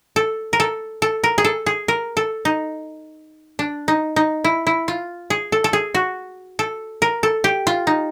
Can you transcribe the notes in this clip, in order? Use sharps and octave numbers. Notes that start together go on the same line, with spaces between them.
A4
A#4
A4
A4
A#4
G#4
A4
G#4
A#4
A4
D#4
D4
D#4
D#4
E4
E4
F4
G#4
A4
A4
G#4
F#4
A4
A#4
A4
G4
F4
D#4